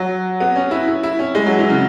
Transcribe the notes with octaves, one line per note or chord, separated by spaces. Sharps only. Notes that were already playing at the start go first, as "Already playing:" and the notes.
Already playing: F#3
B3
C#4
E4
E4
E4
C#4
G#3
F#3
E3
C#3